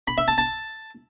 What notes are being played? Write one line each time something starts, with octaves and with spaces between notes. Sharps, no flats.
B5
E5
A5
A5